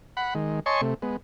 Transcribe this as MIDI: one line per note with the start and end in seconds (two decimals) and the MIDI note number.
0.17 0.34 78
0.17 0.34 83
0.35 0.60 51
0.35 0.60 56
0.66 0.81 73
0.66 0.81 75
0.66 0.81 80
0.66 0.81 81
0.66 0.81 84
0.66 0.81 85
0.81 0.94 48
0.81 0.94 57
1.02 1.17 56
1.02 1.17 59